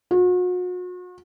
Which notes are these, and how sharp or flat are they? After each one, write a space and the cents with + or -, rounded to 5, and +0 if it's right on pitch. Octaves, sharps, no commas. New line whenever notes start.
F#4 -40